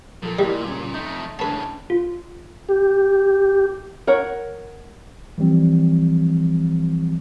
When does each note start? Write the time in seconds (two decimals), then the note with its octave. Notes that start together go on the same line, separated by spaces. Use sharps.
0.22 A#2 F3 A4
0.39 G3 A#3 E4 D#5
0.64 G2 C#3
0.94 F2 A3 D#4
1.39 A2 C#3 D4 B4 A5
1.90 F4
2.69 G4
4.07 A#4 C#5 F#5
5.38 E3 F3 G3 C4